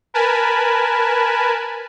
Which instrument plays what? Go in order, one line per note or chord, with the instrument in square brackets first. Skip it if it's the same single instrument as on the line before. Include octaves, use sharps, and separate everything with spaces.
[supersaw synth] A#4 B4 G#5 A5 B5